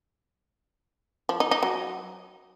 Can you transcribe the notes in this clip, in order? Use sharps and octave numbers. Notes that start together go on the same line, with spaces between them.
F3
D#4
D#4
F#3